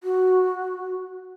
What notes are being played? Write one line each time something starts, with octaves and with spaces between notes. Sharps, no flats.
F#4